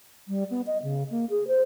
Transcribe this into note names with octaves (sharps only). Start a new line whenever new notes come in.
G3
B3
D#5
C#3
A#3
G#4
C5